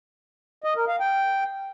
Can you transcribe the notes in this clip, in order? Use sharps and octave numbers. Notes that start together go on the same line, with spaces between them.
D#5
A#4
F5
G5